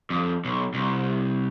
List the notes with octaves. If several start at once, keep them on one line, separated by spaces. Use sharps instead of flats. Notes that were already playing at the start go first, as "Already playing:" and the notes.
F2
B1
C2